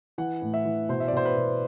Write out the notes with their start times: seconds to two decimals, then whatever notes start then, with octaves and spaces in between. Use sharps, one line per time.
0.18 E3 F#5
0.42 A2
0.54 E5
0.65 E3
0.89 B2 C5
1.00 E5
1.08 D5
1.13 B2 C5
1.25 B4
1.37 B2